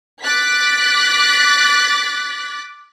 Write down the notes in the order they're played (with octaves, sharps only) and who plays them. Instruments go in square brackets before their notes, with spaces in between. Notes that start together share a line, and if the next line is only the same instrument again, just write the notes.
[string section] D6 F#6 A6 B6